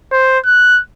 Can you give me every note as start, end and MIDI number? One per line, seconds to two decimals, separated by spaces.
0.12 0.39 72
0.45 0.81 90